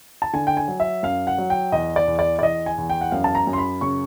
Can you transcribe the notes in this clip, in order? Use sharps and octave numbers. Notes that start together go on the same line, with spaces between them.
A5
D3 G#5
G5
G#5
F#3
E5
F#2 F5
F#5
F#3
G5
E2 D#5
D5
E2
D5
D5
E2 D#5
G#5
E2
G5
F#5
F#2 F5
A5
A#5
F#2
C6
B5
C#3 C#6